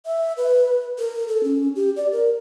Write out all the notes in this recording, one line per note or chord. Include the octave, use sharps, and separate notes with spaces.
E5
B4
A#4
A4
C#4
G4
D5
A#4